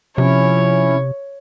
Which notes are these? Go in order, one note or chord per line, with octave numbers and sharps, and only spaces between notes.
C3 F3 C#4 E4 C#5